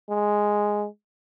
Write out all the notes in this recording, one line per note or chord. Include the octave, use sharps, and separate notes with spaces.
G#3